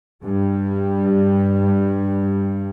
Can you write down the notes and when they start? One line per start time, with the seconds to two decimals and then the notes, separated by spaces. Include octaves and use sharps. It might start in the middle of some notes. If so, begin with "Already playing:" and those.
0.24 G2 G3